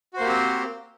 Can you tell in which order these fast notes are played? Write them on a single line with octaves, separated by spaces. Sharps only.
F#4 C5 A#3 G4 C4